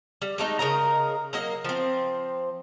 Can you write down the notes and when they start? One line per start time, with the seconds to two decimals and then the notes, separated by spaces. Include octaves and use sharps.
0.22 G3
0.38 G#3 A3 D#4
0.59 C#3 A#4 D#5 A#5
1.33 F#3 A#3 D#5
1.64 F3 C4